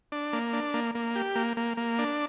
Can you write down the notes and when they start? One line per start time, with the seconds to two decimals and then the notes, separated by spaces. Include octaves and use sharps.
0.12 D4
0.33 A#3
0.53 D4
0.74 A#3
0.95 A#3
1.16 G4
1.36 A#3
1.57 A#3
1.77 A#3
1.99 D4